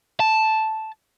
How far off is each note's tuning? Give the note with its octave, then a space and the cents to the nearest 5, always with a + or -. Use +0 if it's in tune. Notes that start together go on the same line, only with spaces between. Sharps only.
A5 -5